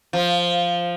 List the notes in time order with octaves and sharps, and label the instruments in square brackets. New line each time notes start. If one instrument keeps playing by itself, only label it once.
[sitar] F3